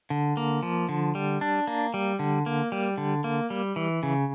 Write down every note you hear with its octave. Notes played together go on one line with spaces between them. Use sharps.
D3
A#3
F3
D3
G3
D4
A#3
G3
D3
A#3
G3
D3
A#3
G3
E3
C#3